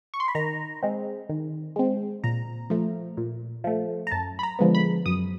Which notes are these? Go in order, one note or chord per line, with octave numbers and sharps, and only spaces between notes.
C#6
C6
B5
D#3 A#5
G#3 C4
D#3
G#3 C4
A#2 A#5
F3 A3
A#2
F3 A3
A#5
F#2 A5
B5
A#5
D3 F3 G#3 B3
B5
F#2 D#6